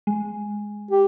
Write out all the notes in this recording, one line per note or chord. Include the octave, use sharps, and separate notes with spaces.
G#3
G4